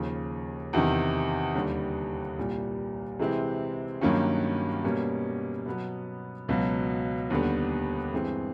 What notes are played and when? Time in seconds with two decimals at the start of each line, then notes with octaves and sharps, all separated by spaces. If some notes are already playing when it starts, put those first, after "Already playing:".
Already playing: D#2 C#3 F3
0.73 E2 C3 D#3
1.55 D#2 D3 G3
2.38 C2 A#2 G3
3.19 C3 E3 G#3 C4 E4
4.01 G2 D#3 F#3 A#3 C#4
4.84 B2 G3 A#3 C#4
5.66 B2 F#3 B3
6.48 C#2 B2 F#3
7.30 D#2 D3 G3 B3
8.13 G2 E3 G#3 C4